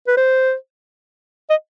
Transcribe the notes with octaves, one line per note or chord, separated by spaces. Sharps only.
B4
C5
D#5